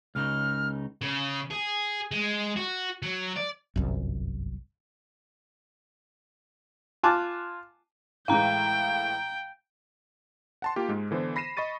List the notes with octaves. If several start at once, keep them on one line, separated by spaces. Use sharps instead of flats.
C#2 C#3 D#4 F6
C#3
G#4
G#3
F#4
F#3
D5
G1 C2 F#2
F4 G#5 A5 D6 F#6
A2 E3 G#3 F5 G5 A#5
F#5 A5 C6
A#3 F4 G4
G#2 G#3
D3 E3 B3 C5
B5 A#6 C7 D#7 E7
D#5 B5 C#6 A6 D#7